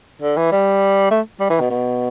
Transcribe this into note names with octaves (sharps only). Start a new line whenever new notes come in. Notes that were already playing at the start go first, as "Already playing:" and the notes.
D3
E3
G3
A3
G3
E3
B2
B2